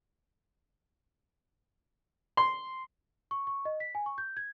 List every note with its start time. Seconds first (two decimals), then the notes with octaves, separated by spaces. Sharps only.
2.37 C6
3.31 C#6
3.47 C#6
3.65 D#5
3.80 B6
3.95 G#5
4.06 C#6
4.18 G6
4.37 G#6